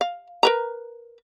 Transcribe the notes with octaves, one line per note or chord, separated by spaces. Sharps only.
F5
A#4 B4 A#5